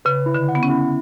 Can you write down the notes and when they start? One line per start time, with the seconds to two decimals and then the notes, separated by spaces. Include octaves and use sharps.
0.05 C#3 B4
0.26 E4
0.34 D3
0.49 F#5
0.55 B3
0.63 C#4
0.70 E4